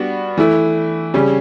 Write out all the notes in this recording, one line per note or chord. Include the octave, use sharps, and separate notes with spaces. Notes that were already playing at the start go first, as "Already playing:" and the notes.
Already playing: G3 B3 D4 F#4
E3 A3 E4
C#3 G3 C#4